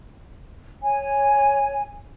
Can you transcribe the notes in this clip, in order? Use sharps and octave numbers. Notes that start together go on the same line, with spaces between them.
C#5 G#5